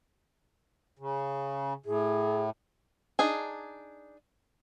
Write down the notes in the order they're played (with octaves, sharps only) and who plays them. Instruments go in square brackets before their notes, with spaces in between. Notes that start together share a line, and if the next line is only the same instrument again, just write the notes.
[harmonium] C#3
[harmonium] A2 [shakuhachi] G#4
[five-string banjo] D4 D#4 G#4 G#5